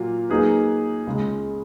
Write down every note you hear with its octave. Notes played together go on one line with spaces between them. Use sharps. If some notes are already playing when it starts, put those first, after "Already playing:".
Already playing: A#2 F#3 A#3 F4
F#3 A#3 D#4 G#4 B4
C#2 C#3 G#3